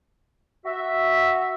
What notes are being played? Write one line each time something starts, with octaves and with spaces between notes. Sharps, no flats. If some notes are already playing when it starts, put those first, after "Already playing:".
F#4 E5